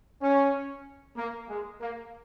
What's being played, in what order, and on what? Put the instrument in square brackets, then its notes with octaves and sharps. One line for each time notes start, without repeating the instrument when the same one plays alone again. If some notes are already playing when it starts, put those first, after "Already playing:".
[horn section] C#4
A#3
G#3
A#3